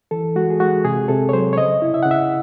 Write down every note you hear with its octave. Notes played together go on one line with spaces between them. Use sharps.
E3 A4
G#3 F#4
G#4
G#3 F#4
C3 G#4
C3 A4
C#5
F#3 C5
C#5
C#3 D#5
E4
E5
C#3 F#5
E5